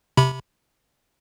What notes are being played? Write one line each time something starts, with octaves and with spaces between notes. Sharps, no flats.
C3 B5